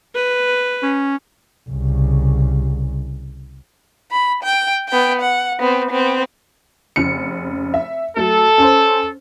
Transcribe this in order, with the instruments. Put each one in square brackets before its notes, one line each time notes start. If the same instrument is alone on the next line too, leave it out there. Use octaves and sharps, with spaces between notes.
[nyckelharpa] B4
[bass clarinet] C#4
[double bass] C2 C#3
[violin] B5
G5
B3 G5
F#5
B3 C4
B3 C4
[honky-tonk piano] F1 C#3 C#7
E5
[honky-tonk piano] F#3 A3 [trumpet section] A4
[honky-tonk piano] C#4 C5